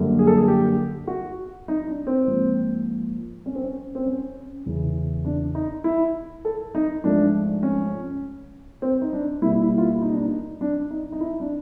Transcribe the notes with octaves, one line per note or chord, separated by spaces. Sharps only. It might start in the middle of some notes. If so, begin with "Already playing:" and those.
Already playing: F#2 D3 G3 A#3
G#4
A4
G#4
G4
F#4
D#4
D4
C4
G#2 F3 A#3
C#4
C4
C#4
C4
C#4
E2 C#3 E3
D4
D#4
E4
A4
D#4
G#2 F3 A3 D4
C#4
C4
D#4
D4
B2 G3 A#3 E4
E4
F4
E4
D#4
D4
D#4
D4
D#4
D#4
E4
D4